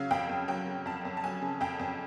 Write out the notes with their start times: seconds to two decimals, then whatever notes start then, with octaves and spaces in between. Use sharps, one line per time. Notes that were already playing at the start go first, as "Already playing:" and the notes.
Already playing: C#3 F#3 F5
0.11 F2 G5
0.29 F2
0.48 F#3 G5
0.67 C#3
0.86 F2 A5
1.05 F2
1.17 A5
1.24 F#3 G#5
1.42 C#3
1.61 F2 G5
1.79 F2